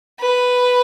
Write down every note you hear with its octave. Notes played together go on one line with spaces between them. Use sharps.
B4